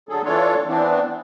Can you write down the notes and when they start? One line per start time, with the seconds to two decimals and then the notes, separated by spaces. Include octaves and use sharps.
0.09 D3 F#3 G#4 A4
0.25 E3 D4 F4 A4 C#5
0.67 E3 B3 C4 D4